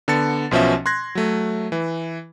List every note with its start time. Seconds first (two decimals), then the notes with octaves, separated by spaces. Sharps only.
0.08 D3 B3 A5 A6 C#7
0.51 B1 B2 F3 C#4 E5
0.86 C6 F#6 G#6 A#6
1.15 F#3 A3
1.72 E3